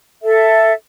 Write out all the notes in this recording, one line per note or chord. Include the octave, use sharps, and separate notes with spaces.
A4 E5